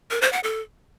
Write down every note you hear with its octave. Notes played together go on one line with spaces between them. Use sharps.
A#4
C5
F#5
A4